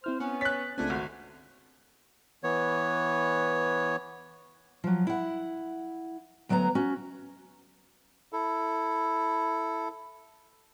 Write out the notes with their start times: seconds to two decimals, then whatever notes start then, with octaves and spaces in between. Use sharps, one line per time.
0.04 C4 E4 C5 F6
0.20 B3 C#4
0.41 C#5 F#6 A6 B6
0.78 C#2 A3 C4 D4 F4 G#5 G#6
0.90 G#1 F#4
2.44 E3 B3 C#5
4.84 F3 F#3
5.07 E4 F#5
6.49 D2 F#3 B3 F5 A#5
6.75 C#4 F#4
8.33 E4 A4